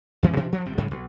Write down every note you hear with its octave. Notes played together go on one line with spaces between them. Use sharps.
F2 E3 G#3 C#4
B2 E3 C4 D4
D2 G2 F3
G1 A2 G3 C4
G#2 C#3 G3 G#3
B1